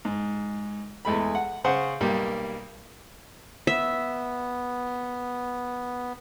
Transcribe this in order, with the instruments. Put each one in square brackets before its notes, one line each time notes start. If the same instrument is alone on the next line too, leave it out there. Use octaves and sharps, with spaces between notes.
[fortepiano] G#2
E2 G#3 A3 B5
F#5
C#3 C5 F#5
B1 G3 A#3
[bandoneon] B3 [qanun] E5